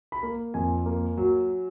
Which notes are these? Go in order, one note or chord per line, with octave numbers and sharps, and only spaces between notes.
B5
A#3
F2 G#5
A#3
F#3